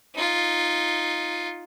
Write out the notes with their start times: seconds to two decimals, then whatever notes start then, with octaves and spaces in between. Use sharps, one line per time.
0.15 D#4 F4